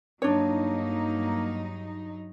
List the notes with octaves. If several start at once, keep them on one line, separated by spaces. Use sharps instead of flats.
G2 F#3 A#3 D4 D#4 C#5